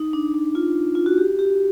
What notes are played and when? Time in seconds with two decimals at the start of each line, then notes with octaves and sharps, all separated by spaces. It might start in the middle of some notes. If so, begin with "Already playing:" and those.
Already playing: D#4
0.13 D4
0.34 D#4
0.55 F4
0.95 F4
1.06 F#4
1.18 G4
1.39 G4